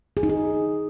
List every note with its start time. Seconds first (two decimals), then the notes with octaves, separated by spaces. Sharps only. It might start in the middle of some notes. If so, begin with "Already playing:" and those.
0.17 G#4
0.23 D#4
0.30 G#4